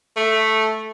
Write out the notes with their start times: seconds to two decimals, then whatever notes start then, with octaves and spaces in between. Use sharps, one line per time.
0.17 A3